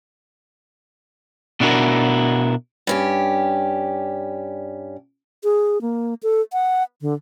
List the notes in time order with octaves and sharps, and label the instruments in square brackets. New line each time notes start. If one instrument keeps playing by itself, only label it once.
[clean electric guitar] B2 D4 E4 F#4 A#4
[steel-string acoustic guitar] G2 C#4 G4
[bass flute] G#4
A#3
A4
F#5
D3